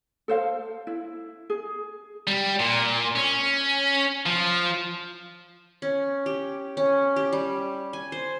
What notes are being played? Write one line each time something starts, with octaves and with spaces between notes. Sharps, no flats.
A4 C5 F5
E4
G#4
G3
A#2
C#4
F3
C#4
G4
C#4
G4
G3
G#5
C5